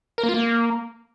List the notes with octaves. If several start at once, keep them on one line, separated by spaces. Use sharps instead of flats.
A#4
A#3
F4
A#3